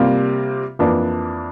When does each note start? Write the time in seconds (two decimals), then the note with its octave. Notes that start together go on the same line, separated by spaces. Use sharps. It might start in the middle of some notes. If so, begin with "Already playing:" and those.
Already playing: C3 G3 A#3 F4
0.79 F2 E3 A#3 D4